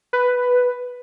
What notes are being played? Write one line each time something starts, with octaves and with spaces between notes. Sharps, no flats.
B4